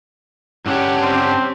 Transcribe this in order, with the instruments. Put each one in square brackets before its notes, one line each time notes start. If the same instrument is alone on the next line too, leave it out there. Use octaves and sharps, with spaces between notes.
[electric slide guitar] G2 D4 F#5 [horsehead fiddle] C#4 G4
[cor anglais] C4